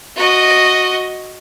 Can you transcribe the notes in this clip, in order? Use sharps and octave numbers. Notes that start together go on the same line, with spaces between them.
F#4 D#5